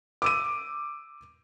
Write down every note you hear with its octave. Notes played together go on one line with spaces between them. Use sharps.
D6 E6 D#7